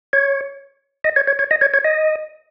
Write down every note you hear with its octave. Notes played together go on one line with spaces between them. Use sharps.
C#5
D#5
C#5
C#5
C#5
D#5
C#5
C#5
D#5